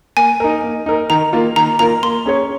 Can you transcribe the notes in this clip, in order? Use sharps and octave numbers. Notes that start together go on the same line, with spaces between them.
A#3 G#5
D#4 A#4
A#3
D#4 A#4
D#3 A#5
A#3 F4 A#4
D#3 A#5
A#3 F4 A#4 A#5
A#3 C6
C#4 G#4 C#5